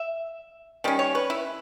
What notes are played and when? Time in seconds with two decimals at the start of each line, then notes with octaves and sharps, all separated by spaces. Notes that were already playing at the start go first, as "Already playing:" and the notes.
Already playing: E5
0.84 D#3 G3 C#4
0.99 C#5
1.15 B4
1.30 E4